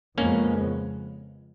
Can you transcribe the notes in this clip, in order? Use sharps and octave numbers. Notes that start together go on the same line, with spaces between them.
F2 C#3 F3 G#3 A#3 B3 C#4